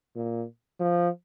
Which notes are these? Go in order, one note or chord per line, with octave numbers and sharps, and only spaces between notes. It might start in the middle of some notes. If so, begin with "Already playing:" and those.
A#2
F3